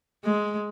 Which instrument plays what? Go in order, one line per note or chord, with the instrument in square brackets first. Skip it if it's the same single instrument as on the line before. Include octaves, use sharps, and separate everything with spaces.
[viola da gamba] G#3